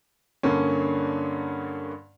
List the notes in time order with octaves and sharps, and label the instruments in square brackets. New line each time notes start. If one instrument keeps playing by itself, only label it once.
[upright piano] G2 D3 A#3 C#4